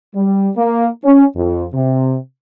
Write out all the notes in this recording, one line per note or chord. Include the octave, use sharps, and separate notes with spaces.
G3
A#3
C#4
F2
C3